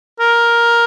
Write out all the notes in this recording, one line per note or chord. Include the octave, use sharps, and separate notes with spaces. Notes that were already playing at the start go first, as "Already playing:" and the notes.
A#4